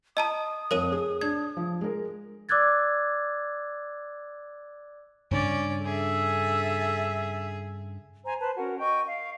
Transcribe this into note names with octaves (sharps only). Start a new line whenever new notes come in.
D#5 A5 A#5 D#6
F2 F3 A#4 C#5 D#7
G#4
D4 G#6
F3
G#3 A#4
D5 D6 E6 F#6 G#6 A6
G2 C#3 C#4 D4 D5
G#4 A4 E5
C5 G#5 A#5
B4 C5 A5
C#4 F#4 A#4 F#5
D#5 G5 C#6
F5